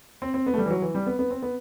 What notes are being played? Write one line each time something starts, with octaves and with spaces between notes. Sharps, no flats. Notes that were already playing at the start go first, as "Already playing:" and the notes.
C4
C4
B3
A3
G3
E3
F#3
E3
G3
B3
B3
C4
B3